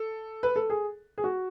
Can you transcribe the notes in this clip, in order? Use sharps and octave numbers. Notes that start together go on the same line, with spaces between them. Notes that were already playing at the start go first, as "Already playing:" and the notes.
Already playing: A4
B4
A4
G#4
G#4
F#4